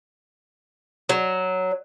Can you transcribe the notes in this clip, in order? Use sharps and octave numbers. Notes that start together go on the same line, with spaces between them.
F#3